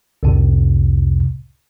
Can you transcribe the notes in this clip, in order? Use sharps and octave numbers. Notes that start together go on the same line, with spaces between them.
C2 F2 A2 C3